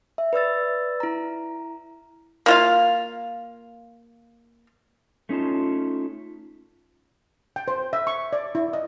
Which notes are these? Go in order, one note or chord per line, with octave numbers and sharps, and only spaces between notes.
E5
B4 D5 E6 A6
E4 A#5
A#3 F4 F5
A3 C#4 D#4 F4 A5
G5
C5
E5
C#6
D5
E4
D#5